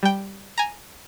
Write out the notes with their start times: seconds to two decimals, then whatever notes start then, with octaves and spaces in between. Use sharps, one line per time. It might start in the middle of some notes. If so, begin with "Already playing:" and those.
0.03 G3 G5
0.58 G#5 A#5